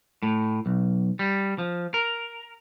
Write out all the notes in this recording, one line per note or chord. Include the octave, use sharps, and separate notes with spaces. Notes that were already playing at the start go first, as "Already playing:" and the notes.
A2
B1
G3
F3
A#4